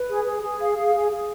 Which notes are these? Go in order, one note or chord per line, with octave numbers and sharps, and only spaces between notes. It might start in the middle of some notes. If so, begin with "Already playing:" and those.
Already playing: B4
G#4
G#4
G#4
F5
G#4
G#4
G#4